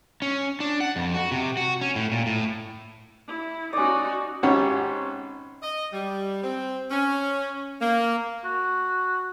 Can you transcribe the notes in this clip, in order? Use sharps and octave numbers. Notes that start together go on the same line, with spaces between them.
C#4
D4
F#5
F2
F#4
C3
F#4
C#4
A2
A#2
A2
E4
C#4 D#4 F#4 D5
G#1 G#2 C#4 G4 C#5 F#5
D#5
G3
C4
C#4
A#3
F#4